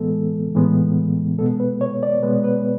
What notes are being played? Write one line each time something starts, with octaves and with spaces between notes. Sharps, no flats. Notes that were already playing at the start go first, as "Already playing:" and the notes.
Already playing: A2 E3 G#3 B3 A4
A2 E3 G#3 B3
B2 G#3 B3 A4
B4
C#5
D5
B2 G#3 B3 B4
B4